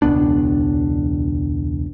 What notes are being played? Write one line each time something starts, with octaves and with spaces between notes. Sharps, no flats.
E1 C#2 B3 D4